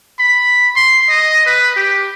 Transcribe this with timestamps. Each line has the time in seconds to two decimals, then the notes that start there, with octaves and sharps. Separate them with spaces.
0.19 B5
0.76 C6
1.09 D#5
1.46 B4
1.76 G4